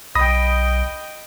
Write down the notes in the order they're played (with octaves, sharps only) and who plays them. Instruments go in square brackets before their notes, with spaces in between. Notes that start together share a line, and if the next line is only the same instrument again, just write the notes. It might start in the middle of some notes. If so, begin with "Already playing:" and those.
[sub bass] B1 [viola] D#5 G5 [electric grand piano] B5 D#6 A#6